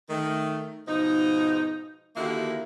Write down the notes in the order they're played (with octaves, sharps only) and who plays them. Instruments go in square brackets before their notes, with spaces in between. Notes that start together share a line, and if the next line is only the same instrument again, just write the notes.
[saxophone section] D#3 A3
G#2 B2 F3 D#4
D3 D#3 A#3 E4 F#4 G4